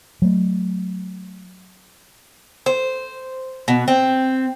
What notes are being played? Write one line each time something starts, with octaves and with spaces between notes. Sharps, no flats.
F#3 A3
C5
B2
C4